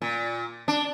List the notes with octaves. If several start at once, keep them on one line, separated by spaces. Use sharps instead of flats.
A#2
D4